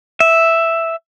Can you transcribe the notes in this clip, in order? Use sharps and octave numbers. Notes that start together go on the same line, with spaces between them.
E5